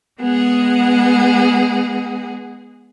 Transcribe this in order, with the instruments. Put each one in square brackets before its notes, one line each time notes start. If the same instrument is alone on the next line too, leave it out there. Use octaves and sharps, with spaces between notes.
[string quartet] G#3 B3 G#4 F#5